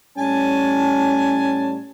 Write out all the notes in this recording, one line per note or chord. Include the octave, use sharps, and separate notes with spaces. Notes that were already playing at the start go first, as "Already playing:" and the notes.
A2 G3 C#4 G#5 A5